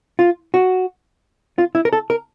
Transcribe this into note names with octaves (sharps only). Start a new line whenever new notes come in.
F4
F#4
F4
E4
A#4
A4
A#4